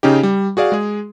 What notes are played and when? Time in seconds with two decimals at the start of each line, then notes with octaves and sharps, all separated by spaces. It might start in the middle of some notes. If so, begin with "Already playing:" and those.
0.03 C#3 C#4 D#4 G4
0.23 G3
0.57 F#4 G#4 D5 F5
0.72 G#3 G#4